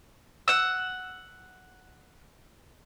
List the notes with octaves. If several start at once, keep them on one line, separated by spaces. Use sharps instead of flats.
F#5 E6